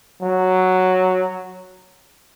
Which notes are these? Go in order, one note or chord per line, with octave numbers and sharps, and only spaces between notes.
F#3